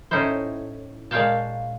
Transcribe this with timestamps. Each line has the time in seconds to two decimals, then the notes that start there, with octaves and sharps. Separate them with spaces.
0.11 A2 C#4 D#4 E4 C5
1.11 A#2 G#3 C#5 F5 G5 A5